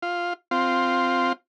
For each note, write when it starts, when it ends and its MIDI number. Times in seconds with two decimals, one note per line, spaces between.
0.02 0.33 65
0.51 1.33 60
0.51 1.33 65